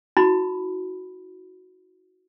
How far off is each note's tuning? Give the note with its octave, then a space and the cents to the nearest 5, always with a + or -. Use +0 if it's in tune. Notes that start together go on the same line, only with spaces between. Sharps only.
D#4 +45 F#4 -10 B5 +0